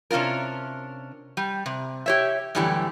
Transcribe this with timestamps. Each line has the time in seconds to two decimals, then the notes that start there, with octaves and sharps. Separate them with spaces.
0.11 C3 C#4 D4 F4 A#4
1.37 G3
1.66 C3
2.06 G4 C#5 E5
2.55 F#2 A2 D3 E3 G3 G4